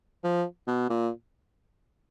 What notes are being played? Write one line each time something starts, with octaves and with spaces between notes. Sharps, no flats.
F3
B2
A#2